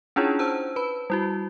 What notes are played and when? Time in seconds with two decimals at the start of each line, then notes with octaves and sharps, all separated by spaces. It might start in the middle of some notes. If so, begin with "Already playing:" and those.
0.16 C#4 D4 E4 F4 G#4 C#5
0.39 C5 A5 E6
0.76 B4 B5
1.10 G3 E4 F#4